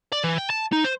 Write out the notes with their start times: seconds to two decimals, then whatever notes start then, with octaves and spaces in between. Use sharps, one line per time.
0.12 D5
0.24 E3
0.38 G5
0.50 A5
0.72 D#4
0.84 C5